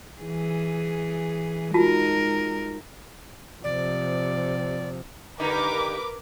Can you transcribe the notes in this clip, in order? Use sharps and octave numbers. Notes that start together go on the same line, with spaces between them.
E3 G#4
G#3 D#4 F4 F#4 A#4 A5
C3 F3 D5
G2 D3 D#4 A#4 B4 D6